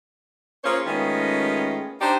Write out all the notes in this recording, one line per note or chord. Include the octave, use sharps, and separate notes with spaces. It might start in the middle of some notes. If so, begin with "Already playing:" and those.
A#3 C#4 F4 G#4 C5 C#5
D#3 G#3 A3 B3 C#4 F4
D4 D#4 G4 C5 D5